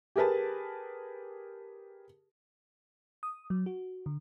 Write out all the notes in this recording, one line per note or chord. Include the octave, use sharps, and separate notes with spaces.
G4 G#4 A#4 B4 A5
D#6
F#3
F#4
D3